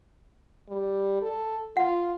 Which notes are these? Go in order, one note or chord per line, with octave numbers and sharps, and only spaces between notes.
G3
A4
F4 F#5